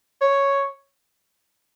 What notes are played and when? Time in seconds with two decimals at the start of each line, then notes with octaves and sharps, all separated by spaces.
0.21 C#5